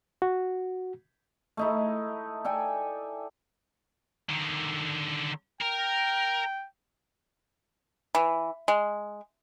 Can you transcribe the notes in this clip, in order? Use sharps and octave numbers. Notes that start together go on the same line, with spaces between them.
F#4
A3 D#4 E4
A4 D5 G5 G#5
D3 D#3
A#4 G5
E3
G#3